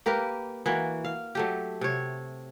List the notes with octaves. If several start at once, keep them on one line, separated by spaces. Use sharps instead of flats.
A#3 G4 A#4 B4
E3 A#3 F#4
F5
F#3 A3 G4
C3 C#5